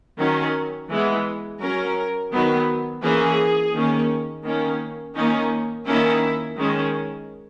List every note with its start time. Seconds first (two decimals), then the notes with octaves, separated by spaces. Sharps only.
0.18 D#3 F#3 C#4
0.90 E3 G#3 B3
1.60 F#3 C#4 A#4
2.31 D#3 F#3 B3
3.02 E3 A#3 C#4 G#4
3.73 D#3 A#3 C#4
4.44 D#3 A#3 C#4
5.16 D#3 A#3 C#4 D#4
5.86 D#3 A#3 C#4 E4
6.57 D#3 G#3 C#4